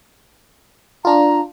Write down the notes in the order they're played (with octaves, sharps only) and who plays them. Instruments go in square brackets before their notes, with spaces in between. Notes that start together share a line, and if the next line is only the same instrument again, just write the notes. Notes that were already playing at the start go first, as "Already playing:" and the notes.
[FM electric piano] D4 F4 [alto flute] A#5